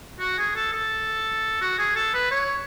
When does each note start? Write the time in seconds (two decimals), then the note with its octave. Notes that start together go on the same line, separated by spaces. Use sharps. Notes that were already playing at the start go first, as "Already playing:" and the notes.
0.20 F#4
0.38 G#4
0.56 A4
0.73 A4
1.61 F#4
1.79 G#4
1.96 A4
2.14 B4
2.31 C#5